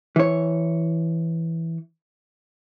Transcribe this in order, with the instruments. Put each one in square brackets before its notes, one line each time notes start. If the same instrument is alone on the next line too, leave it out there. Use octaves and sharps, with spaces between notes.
[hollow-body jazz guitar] E3 C#5